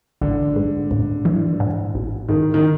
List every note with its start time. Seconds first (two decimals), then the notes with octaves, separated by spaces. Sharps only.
0.21 A1 D3
0.56 G#2
0.91 A1
1.25 E3
1.60 G#2
1.95 A1
2.28 G#2 D#3
2.54 D#3